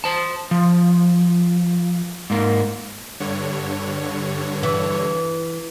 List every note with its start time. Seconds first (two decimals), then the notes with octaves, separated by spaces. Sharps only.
0.04 C5 A5
0.51 F3
2.30 G#2 A#3
3.20 G2 D3 C#5
4.63 E3